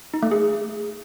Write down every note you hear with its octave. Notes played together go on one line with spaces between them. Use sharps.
D#4
A3
G#4